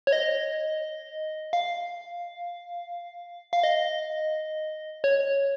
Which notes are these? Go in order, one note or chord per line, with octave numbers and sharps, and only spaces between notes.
C#5
D#5
F5
F5
D#5
C#5